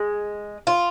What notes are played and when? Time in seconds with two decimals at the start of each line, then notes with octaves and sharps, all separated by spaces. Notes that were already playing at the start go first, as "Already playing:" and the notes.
Already playing: G#3
0.67 F4